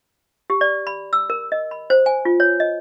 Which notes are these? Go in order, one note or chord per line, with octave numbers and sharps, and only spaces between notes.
G4
D5
B5
E6
A#4
D#5
B5
C5
G#5
F4
C#5
D#5